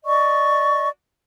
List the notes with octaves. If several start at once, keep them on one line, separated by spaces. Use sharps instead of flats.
D5 D#5 C#6